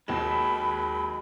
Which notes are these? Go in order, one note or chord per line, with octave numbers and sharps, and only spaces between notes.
D#2 F#3 G#3 B5 E7